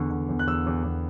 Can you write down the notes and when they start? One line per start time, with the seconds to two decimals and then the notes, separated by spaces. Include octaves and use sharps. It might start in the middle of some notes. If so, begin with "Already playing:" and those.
Already playing: E2 D3 C#6
0.11 D3
0.29 E2
0.39 F#6
0.47 E2 E6
0.67 E2
0.84 E2